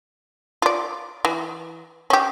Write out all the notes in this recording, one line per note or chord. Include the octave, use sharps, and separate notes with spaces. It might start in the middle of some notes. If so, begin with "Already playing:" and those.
F4 D5
E3
C#4 G4